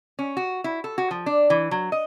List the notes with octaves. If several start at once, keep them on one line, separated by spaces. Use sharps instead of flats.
C#4
F#4
E4
A4
F#4
F3
D4
E3
F#3
D#5